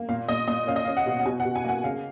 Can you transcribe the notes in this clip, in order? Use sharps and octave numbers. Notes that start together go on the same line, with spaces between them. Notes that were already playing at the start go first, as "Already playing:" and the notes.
Already playing: A#3
A#2 F5
A#2 D#5
A#2 D#5
C#4 F5
D#5
F5
C#4
F#5
B2
F#5
B2 G#5
F#5
B2
G#5
A#3 F#5
C#3 F5